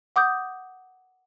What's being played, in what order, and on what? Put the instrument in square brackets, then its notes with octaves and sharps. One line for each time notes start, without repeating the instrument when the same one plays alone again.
[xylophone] F#5 D6 D#6 G6